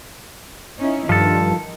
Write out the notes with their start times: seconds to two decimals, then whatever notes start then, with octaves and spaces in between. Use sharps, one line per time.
0.78 C#4 D#4 E4
1.09 G2 D#3 F3 A4